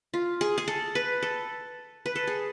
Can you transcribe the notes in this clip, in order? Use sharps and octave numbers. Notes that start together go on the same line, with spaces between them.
F4
G#4
G#4
A4
B4
A4
B4
A4
G#4